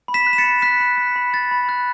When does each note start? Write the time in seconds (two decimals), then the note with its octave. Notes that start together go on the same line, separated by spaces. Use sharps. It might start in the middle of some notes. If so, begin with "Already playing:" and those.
0.08 B5
0.14 B6 E7
0.27 F#6
0.33 E7
0.38 A6 C#7
0.44 B5
0.62 F#6 B6
0.80 B5
0.98 F#6
1.16 B5
1.33 F#6 A6
1.51 B5
1.69 F#6